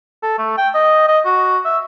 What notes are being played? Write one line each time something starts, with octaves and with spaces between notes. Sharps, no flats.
A4
A3
G5
D#5
D#5
F#4
E5